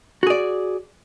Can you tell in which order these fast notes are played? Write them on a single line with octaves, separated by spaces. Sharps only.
F#4 G#4 D5